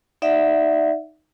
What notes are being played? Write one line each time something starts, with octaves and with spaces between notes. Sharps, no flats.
D#4 D5 E5 F#5